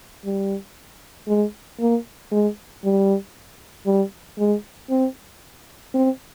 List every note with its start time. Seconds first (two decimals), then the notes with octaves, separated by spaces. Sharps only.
0.25 G3
1.28 G#3
1.80 A#3
2.32 G#3
2.84 G3
3.86 G3
4.38 G#3
4.90 C4
5.94 C4